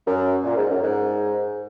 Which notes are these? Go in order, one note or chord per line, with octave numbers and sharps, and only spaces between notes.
F#2
A#2
G#2
F#2
G#2